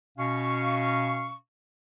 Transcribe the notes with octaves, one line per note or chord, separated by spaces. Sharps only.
B2 C#4 F5 C#6